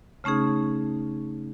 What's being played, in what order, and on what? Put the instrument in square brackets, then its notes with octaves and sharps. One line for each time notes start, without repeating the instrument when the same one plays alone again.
[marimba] C#3 A3 C#4 D#4 G#4